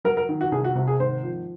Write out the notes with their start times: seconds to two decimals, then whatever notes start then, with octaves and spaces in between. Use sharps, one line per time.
0.05 F#3 A#4
0.17 A#4
0.29 D#3
0.41 F#4
0.52 C2 G#4
0.64 F#4
0.75 C3 F#4
0.87 G#4
1.00 G#1 C5
1.23 F3